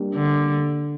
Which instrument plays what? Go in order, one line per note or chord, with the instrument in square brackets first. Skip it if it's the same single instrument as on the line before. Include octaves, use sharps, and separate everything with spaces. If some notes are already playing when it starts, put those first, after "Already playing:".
Already playing: [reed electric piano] G3 A#3 D4 G4
[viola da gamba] D3